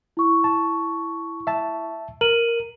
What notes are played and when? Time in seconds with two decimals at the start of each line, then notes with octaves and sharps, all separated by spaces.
0.17 E4 C#6
0.44 A5
1.47 E5 A5
2.21 A#4 D#7 F#7